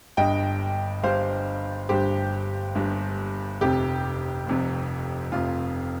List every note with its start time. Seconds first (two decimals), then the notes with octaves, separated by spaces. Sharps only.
0.17 G1 G2 G3 D#5 G5
1.03 G1 G2 G3 C5 F5
1.89 G1 G2 G3 G4 C5
2.75 G1 G2 G3
3.61 F1 F2 C3 G4
4.47 F1 F2 C3
5.32 F1 F2 C3 F4